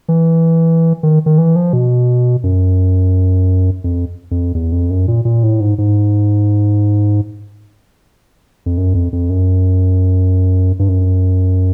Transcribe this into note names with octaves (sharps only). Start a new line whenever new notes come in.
E3
D#3
D#3
E3
F3
B2
F#2
F2
F2
E2
F2
F#2
A#2
A#2
A2
G#2
G#2
F2
F#2
F2
F2
F#2
G2
F#2